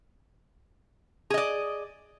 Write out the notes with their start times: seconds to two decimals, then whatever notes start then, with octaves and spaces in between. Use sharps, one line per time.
1.30 G#4
1.34 D#5
1.38 D5